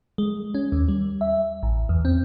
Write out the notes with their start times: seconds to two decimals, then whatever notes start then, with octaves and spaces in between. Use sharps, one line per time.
0.18 G#3
0.55 C#4
0.72 D#2
0.88 G3
1.21 E5
1.63 A1
1.89 E2
2.05 C4